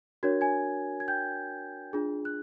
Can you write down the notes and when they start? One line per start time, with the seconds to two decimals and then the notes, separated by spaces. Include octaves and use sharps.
0.23 D4 F#4 A#4 C#5 G#6
0.41 G#5 G#6
1.00 G#6
1.08 G5 G6
1.93 D4 F4 G#4
2.25 F#6